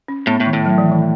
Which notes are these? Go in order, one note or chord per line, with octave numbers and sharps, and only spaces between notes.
C#4
A2 B3
A2
D#3
A2
F#3
E3
D#3